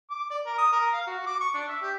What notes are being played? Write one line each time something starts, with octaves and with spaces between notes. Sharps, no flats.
D6
D5
A#4
D#6
A#4
F5
F#4
D6
C#6
D4
E5
G4